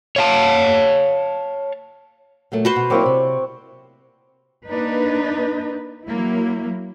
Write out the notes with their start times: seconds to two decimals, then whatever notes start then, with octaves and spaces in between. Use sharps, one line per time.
0.16 C#5 F5 A5
2.52 A#2 F#3 A3
2.65 F#4 B4 C5
2.76 B2
2.90 F#3 A#3 C4 E4 C#5 D5
3.06 C3
4.69 A#3 D4 D#4 B4
6.06 F#3 A#3 E4